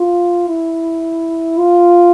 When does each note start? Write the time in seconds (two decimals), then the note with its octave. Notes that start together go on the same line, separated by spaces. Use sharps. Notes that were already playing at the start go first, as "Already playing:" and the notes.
Already playing: F4
0.48 E4
1.58 F4